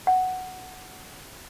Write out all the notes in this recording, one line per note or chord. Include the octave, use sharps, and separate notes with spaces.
F#5